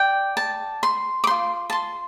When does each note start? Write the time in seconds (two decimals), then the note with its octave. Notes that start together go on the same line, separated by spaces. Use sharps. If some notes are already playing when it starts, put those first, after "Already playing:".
Already playing: D5 G5
0.37 A5
0.83 C6
1.24 D6
1.27 F4 C5 C6
1.70 A5
1.72 C6